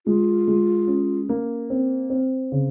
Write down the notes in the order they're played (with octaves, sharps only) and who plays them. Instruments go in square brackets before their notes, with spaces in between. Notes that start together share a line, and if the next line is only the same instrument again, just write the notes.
[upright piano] G#3 [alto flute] F4
[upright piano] G#3
C#4
A#3
C4
C4
C#3